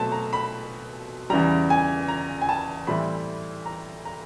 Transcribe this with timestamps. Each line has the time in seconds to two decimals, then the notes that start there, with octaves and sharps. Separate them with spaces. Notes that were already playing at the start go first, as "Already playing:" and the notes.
Already playing: B2 F#3 A3 C4 A5
0.12 A#5
0.33 B5
1.30 E2 C#3 E3 G3 A#5
1.70 G#5
2.08 A#5
2.41 G#5
2.49 A5
2.87 A2 E3 G3 C4 B5
3.66 A#5
4.05 A#5